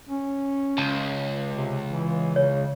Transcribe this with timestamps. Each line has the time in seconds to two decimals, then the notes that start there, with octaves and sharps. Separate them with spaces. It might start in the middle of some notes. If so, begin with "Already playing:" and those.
0.09 C#4
0.78 C#2 A5
1.49 C3
1.86 E3
2.36 C#3 C#5